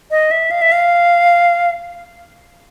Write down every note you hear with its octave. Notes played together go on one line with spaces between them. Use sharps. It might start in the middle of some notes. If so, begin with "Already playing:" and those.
D#5
E5
F5
E5
F5